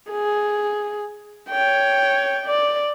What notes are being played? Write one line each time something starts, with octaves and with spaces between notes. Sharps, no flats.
G#4
C#5 G5
D5